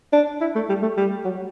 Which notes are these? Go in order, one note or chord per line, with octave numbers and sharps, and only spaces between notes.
D4
E4
A3
G3
A3
G3
F#3